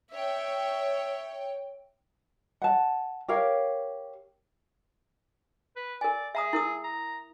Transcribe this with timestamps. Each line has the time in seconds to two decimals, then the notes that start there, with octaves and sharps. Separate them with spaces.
0.12 C#5 E5 G5
2.62 F#5 A5
3.28 G4 A#4 C#5 F5
5.76 B4
6.01 A#4 D5 G#5
6.35 G#4 E5 A#5 D#6
6.53 E4 A#4 D#6
6.84 A#5